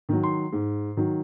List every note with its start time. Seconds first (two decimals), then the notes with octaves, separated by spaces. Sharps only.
0.09 D#3 F#3
0.23 C6
0.53 G#2
0.97 D#3 F#3